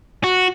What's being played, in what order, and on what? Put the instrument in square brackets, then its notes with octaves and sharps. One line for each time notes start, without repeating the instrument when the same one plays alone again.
[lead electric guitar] F#4